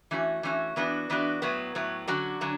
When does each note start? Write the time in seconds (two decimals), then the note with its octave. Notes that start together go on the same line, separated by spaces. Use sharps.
0.11 E3 A3 C#4 F#4
0.43 E3 A3 C#4 F#4
0.76 E3 B3 D4 F#4
1.10 E3 B3 D4 F#4
1.42 A2 F#3 B3
1.75 A2 F#3 B3
2.08 D3 F#3 C#4 F#4
2.41 D3 F#3 C#4